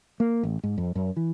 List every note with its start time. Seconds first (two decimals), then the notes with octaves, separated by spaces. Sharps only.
0.20 A#3
0.43 A1
0.64 G#2
0.78 F2
0.95 F#2
1.17 E3